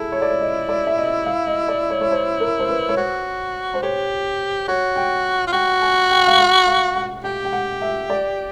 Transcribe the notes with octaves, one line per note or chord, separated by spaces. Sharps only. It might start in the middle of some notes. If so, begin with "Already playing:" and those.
Already playing: E4 G#4 A4
C#5
D5
C#5
D#5
D5
E5
D#5
F5
D#5
D5
C#5
C#5
C5
A#4
C5
B4
C#5
F#4 C5
C5
G4 C#5
F#4 C#5
G5
F4
F#4 G5
G#5
G5
F5
F#5
F5
F#5
G4 G5
G5
F#5
E5
D5